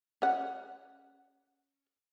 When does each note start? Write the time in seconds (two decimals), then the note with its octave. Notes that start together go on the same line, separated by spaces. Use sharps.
0.22 C#4 F#5